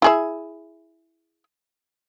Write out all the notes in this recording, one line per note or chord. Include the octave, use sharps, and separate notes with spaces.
E4 G#4 E5